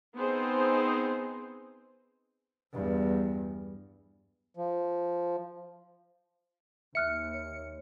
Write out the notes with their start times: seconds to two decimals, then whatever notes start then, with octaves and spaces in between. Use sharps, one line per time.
0.14 B3 C4 D#4 G#4 C5
2.73 E2 G2
4.57 F3
6.95 D#2 E5 F6 F#6 C#7
7.34 C#5